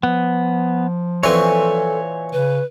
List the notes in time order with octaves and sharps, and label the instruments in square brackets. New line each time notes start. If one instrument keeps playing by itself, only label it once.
[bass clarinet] F3 [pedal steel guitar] B3
[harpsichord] A#2 E3 C4 [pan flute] A4 [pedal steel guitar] C#5 G#5 C#6
[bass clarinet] C#3 [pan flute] B4